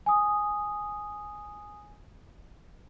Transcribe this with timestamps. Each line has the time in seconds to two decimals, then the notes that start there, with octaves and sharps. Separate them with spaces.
0.06 G#5 D#6